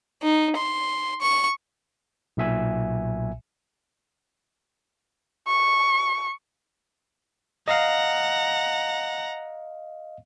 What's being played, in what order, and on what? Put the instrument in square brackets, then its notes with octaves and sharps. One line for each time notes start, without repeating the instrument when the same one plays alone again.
[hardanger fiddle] D#4
C6
C#6
[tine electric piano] B1 A#2 E5 G#5
[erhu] C#6
[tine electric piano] D#5 F5 [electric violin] F#5 A#5